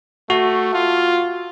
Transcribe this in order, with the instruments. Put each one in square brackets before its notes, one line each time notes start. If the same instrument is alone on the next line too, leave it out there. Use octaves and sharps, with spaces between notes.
[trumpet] A3 [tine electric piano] F#4
[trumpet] F4